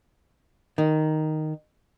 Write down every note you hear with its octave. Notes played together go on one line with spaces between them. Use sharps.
D#3